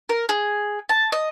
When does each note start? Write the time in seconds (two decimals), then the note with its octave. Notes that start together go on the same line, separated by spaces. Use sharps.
0.09 A#4
0.29 G#4
0.89 A5
1.12 D#5